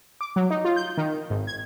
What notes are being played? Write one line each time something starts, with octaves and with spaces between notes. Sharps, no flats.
D6
F#3
D#4
F4
G6
D#3
G#1
G#6